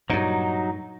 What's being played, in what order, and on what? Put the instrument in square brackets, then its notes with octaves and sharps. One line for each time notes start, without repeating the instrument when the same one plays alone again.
[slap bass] G2 A#2 [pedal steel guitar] F#3 D#4